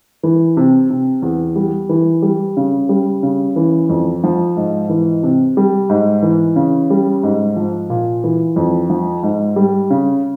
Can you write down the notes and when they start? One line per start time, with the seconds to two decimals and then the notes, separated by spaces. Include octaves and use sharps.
0.23 E3
0.57 C3
0.90 C3
1.22 E2
1.56 G3
1.89 E3
2.22 G3
2.57 C#3
2.89 G3
3.23 C#3
3.56 E3
3.89 F2
4.24 F3
4.56 G#2
4.89 E3
5.23 C3
5.57 G3
5.90 G#2
6.22 E3
6.56 C#3
6.90 G3
7.23 G#2
7.56 F3
7.90 A#2
8.24 E3
8.56 F2
8.90 F3
9.23 G#2
9.56 G3
9.90 C#3